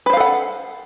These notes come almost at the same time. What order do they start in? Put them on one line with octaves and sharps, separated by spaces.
B4 C5 F5 A4 F#5